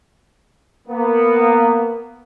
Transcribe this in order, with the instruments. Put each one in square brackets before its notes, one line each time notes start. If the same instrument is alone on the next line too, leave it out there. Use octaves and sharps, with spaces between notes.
[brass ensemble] A#3 B3